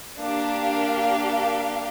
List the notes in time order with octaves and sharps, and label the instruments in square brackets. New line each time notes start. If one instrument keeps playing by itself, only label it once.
[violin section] A#3 D4 G4 F5